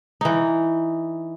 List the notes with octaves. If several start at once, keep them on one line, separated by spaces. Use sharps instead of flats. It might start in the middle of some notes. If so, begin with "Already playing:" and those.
E3 D#4